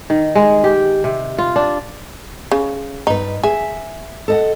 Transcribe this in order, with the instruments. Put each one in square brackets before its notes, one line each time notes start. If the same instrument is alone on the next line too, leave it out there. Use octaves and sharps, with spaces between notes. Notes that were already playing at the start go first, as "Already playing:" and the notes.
[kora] D#3
G#3
G4
C3
F4
D4
[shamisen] C#3
[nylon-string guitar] G2 B4 [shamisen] D#4
[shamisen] G#4 [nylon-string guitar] E5
[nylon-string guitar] A4 D#5 F#5